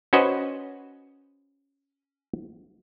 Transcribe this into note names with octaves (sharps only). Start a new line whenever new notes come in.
C#4 F#4 B4 C5 D#5